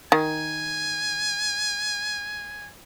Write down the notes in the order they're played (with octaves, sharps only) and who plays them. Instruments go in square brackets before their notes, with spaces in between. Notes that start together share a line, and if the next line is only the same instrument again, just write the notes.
[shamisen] D#3 [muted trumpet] G#5